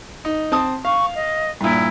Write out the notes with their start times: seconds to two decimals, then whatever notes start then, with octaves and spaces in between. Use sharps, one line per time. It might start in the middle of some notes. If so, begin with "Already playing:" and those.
0.25 D#4
0.52 C4 A5 D#6
0.85 F5 C#6
1.15 D#5
1.61 G2 A#2 E4